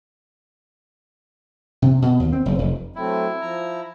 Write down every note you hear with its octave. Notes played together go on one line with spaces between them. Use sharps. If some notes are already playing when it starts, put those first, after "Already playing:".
C3
B2
D#2
C4
F#1
F1
F#3 A3 C4 E4
F3 A#5